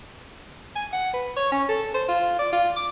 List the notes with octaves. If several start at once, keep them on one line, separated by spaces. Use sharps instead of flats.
G#5
F#5
B4
C#5
C#4
A4
C5
F4
D5
F4
D6